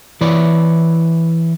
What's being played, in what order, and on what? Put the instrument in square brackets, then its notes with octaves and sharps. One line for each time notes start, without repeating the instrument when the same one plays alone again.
[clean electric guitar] E3 E4 B4 C#5 D5